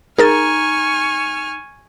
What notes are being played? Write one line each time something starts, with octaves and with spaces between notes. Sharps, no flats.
D#4 G#4 A#4 G#5 C#6 F6 A6